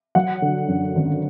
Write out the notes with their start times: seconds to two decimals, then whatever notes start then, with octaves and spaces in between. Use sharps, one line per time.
0.15 F#3 F#5
0.42 D3
0.68 F#2
0.95 G#1